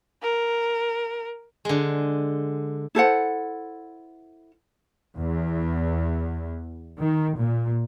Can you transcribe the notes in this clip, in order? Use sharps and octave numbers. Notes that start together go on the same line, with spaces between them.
A#4
D3 G#3
E4 A4 C5 F#5
E2
D#3
A#2